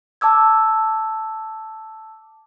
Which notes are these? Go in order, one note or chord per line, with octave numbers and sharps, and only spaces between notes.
A5 D6 E6 G#6